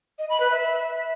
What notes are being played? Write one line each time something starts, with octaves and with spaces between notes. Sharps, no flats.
D#5
B5
B4
E5